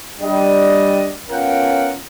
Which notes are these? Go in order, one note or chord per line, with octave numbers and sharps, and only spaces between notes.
G3 D4 D#5
B3 C#4 F4 A#4 F#5 G5